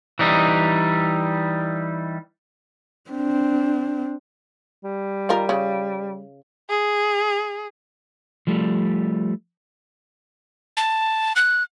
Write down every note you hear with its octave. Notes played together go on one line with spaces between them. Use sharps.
E3 G3 D#4
C4 D4
G3
D#3 F4 A#4
C#3
G#4
F3 G3 A3
A5
F#6